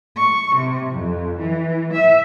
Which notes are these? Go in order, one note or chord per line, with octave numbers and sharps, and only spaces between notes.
C#6
C3
F2
E3
E5